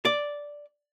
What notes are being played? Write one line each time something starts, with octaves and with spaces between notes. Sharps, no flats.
D5